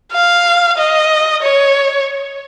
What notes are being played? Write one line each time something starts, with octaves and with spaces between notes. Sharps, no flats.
F5
D#5
C#5